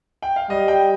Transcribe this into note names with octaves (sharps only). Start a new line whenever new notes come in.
G5
F5
G3 D#5
G5